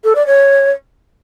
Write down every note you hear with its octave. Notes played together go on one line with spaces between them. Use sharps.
A4
D5
C#5